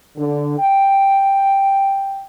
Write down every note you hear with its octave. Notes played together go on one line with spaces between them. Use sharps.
D3
G5